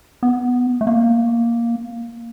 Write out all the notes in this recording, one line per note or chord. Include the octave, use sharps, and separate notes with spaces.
B3
A3
A#3